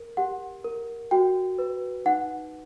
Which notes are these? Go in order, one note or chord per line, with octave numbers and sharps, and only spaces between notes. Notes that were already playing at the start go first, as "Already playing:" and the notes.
Already playing: A#4
G4 F#5
A#4
F#4 G5
B4
D#4 F#5